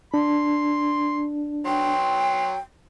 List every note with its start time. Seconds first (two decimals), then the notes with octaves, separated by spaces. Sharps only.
0.14 D4 C6
1.66 F#3 G5 C6